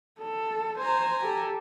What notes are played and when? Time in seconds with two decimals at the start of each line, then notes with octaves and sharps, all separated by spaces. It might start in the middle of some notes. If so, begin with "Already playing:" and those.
0.20 A4
0.78 C5 G#5 A#5
1.19 G4 A4